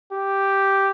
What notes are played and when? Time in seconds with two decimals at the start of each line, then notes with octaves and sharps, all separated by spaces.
0.13 G4